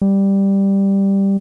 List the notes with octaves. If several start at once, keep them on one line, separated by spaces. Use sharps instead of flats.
G3